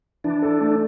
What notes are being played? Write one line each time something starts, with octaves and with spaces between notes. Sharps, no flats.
E3 D4
A4
A3